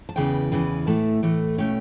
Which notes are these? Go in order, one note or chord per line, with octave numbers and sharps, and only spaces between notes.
A5
E2 C#3 E3 B3 G5
E2 C#3 E3 B3
A2 E3 A3 A5
A2 E3 A3
B2 A3 C#4 G5